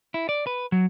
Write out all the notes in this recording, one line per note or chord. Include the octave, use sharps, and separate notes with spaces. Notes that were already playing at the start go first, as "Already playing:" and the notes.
E4
D5
B4
F#3